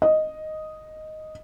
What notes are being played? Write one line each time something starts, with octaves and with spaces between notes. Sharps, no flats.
D#5